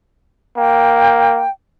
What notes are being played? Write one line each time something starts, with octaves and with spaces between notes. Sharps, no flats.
A#3 G5